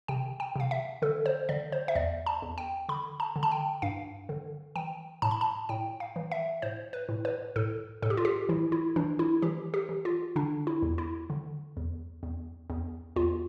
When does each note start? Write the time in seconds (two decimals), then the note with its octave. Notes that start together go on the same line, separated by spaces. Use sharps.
0.08 C3 G5
0.40 G5
0.56 C3 F5
0.71 E5
1.02 D3 A4
1.26 C5
1.49 D3 D5
1.72 C5
1.88 E5
1.95 E2 D5
2.26 A5
2.42 E2
2.58 G5
2.89 D3 B5
3.20 A5
3.36 D3
3.43 A5
3.51 G5
3.82 G2 F5
4.29 D3
4.76 E3 G5
5.22 A2 A5
5.31 B5
5.41 A5
5.69 A2 G5
6.00 F5
6.16 E3
6.32 E5
6.62 A2 C5
6.93 B4
7.09 A2
7.25 B4
7.56 A2 A4
8.02 A2 A4
8.10 G4
8.17 F4
8.25 G4
8.49 E3 E4
8.72 E4
8.96 E3 D4
9.19 E4
9.42 E3 G4
9.74 G4
9.89 E3
10.05 F4
10.36 D3 D4
10.67 E4
10.82 E2
10.98 E4
11.30 D3
11.77 E2
12.23 E2
12.70 E2
13.16 E2 F4